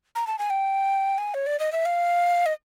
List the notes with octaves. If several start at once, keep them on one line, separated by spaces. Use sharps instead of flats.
A#5
A5
G#5
G5
G#5
C#5
D5
D#5
E5
F5
D#5